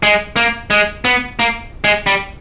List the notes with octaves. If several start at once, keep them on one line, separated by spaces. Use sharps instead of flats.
G#3
A#3
G#3
B3
A#3
G#3
G3